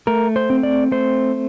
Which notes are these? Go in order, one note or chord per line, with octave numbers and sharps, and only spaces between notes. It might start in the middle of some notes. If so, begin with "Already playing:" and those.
A3 A#4
C5
C4
D5
A3 C5